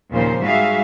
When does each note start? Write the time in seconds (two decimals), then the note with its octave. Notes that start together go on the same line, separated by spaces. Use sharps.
0.12 D#2 A#2 C#3 F3 C5
0.42 G#2 G3 F#4 G#4 E5 F5